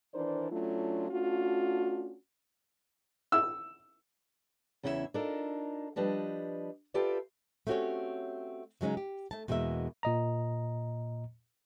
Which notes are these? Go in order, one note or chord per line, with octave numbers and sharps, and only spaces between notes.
D#3 E3 D4 A#4 C5 D5
F#3 A3 C#4 D4 F4
A3 C#4 D4 F4 F#4
E6
E2 C#3 C#4 E4 G#4 E5
D4 D#4 F4 A4 A#4
F3 G3 D4 B4 D#5
F4 G4 A4 B4 D5 E5
A3 C4 C#4 F#4 G4 C#5
C#3 F#3 G#3 C#4 D#4
G4
A3 A5
E2 B2 G#3 A#3 E5
A#2 D#5 A#5